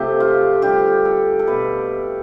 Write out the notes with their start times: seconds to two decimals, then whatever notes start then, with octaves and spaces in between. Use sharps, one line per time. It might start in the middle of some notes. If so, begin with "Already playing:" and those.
Already playing: C3 F3 A3 G4
0.20 F4
0.62 D3 G3 G4
1.05 A4
1.39 A4
1.47 B2 A3 B4